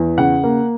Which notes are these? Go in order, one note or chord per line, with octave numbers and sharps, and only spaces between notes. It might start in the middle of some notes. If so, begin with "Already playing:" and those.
Already playing: E2
C#3 F#5
A#3